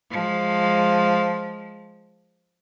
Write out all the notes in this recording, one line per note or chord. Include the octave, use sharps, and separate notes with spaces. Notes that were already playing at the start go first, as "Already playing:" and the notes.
F3 G#3